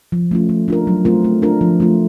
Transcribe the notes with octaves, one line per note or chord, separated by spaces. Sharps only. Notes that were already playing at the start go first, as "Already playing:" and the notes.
F3
A3 C#4 F4
A3
D4 F4 A#4
F#3
A3 C4 F4 A#4
A3
D4 F4 A#4
F3
A3 C4 F4